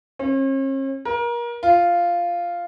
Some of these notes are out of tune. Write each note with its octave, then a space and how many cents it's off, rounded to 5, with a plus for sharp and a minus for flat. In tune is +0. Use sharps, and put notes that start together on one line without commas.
C#4 -45
A#4 +30
F4 -5